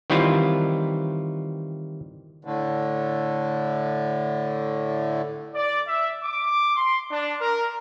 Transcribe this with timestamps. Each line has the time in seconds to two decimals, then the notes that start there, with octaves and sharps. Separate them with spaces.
0.10 D#3 E3 G3 C4 E4 F4
2.45 A2 D3
5.55 D5
5.86 E5
6.23 D6
6.76 C6
7.11 D4
7.41 A#4